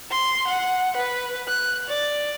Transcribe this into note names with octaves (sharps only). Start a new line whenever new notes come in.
C6
F#5
B4
F#6
D5